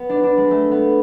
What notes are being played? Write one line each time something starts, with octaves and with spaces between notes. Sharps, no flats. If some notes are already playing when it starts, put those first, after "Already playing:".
Already playing: B3
D4
D4
G#3
A3
B3